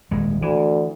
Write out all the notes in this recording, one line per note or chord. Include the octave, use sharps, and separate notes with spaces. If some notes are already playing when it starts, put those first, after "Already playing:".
D#1 G#3
D2 E3